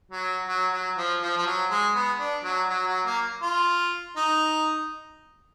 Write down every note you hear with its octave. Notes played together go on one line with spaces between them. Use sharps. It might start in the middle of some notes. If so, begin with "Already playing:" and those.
F#3
F#3
F#3
F3
F3
F3
F#3
G#3
B3
D4
F#3
F#3
F#3
A#3
F4
D#4